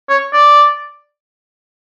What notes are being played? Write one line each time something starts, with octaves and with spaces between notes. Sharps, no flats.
C#5
D5